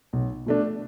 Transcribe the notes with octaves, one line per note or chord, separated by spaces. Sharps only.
B1
B2 A3 D4